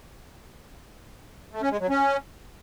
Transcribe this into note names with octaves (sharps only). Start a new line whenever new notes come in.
A3
C#4
G#3
F#3
C#4